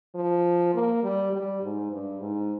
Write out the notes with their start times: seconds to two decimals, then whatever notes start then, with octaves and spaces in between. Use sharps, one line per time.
0.15 F3
0.74 A#3
1.03 G3
1.32 G3
1.62 G#2
1.91 G2
2.21 G#2